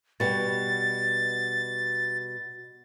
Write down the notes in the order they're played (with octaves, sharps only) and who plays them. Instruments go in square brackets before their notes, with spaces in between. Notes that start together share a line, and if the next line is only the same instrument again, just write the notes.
[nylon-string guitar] B2 G3 [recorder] A6